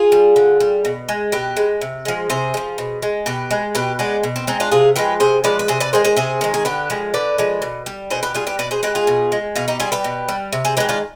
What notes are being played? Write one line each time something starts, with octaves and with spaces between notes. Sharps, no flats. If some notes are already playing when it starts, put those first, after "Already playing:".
Already playing: F4 G#4
G3
D3
G3
B2
G#3
B2 G4 B4
G#3
C3
F3 G#3
C3 G#4 C5
G#3
F3
B2
G#3
B2 G4 B4
G#3
B2 G4 B4
G#3 B3 D4
B2
C4
G#3 C4 D#4
D4 F4
C3 F4 G#4
F3 G#3 G4 B4
C3 G#4 C5
F3 G#3 B4 D5
B4
C3 G#4 C5
B4 D5
D#3 G#3 G#4 C5
G#4 C5
C3 G#4 C5
D#3 G#3
G#4
D3 G4 B4
F3 G#3
D3 B4 D5
F3 G#3
B2
G3
B2 G#4 C5
G4 B4
G3 F4 G#4
G4 B4
B2 B4 D5
G#4 C5
G#3 G4 B4
F4 G#4
B2
G#3
B2 F4 G#4
D#4 G4
G3 F4 G#4
G4 B4
B2
G3
C3
G#4 C5
D#3 G#3 G4 B4
D4 F4